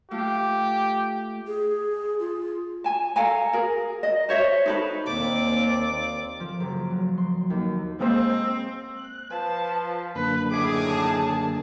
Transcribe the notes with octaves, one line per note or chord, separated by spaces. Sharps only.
A3 F4 G4
G#4
F4
G#5 A5
A4 F5 G#5 A#5
G#4 A#4
D#5
C5 C#5 E5
D#4 A4 B4
D#2 A#3 C4 D5 D6
F3
F#1
F#3
C6
D#2
G#3 A#3 C4 C5
F#6
F3 B4 A5
F#2 D3 A#3 B4
A2 D#3 G#4 D6
A5